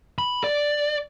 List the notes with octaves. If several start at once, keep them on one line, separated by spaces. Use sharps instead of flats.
B5
D5